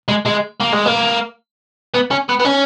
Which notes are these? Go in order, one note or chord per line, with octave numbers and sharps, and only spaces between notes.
G#3
G#3
A#3
G#3
A#3
B3
C#4
B3
B3
C#4